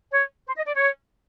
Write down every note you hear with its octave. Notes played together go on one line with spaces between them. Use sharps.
C#5
C5
D#5
D5
C#5